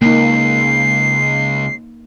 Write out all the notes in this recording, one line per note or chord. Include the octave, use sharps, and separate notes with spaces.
C#2 A#3 D#4 C7